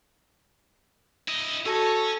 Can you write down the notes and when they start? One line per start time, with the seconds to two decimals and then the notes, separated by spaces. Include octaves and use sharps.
1.28 E4 D#5
1.66 C#4 F#4 A4 G#5 A5 A#6